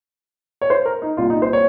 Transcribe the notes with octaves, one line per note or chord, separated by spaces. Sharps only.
C#5
C5
A#4
D#4
C2 A#2 F4
D#4
C5
C#5